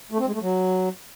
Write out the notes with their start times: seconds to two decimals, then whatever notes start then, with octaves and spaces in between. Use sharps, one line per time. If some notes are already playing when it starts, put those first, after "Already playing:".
0.11 A3
0.19 C4
0.27 G#3
0.34 A3
0.42 F#3